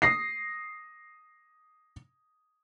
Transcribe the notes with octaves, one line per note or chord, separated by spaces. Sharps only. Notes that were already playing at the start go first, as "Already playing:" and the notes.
D#6 A#6 C7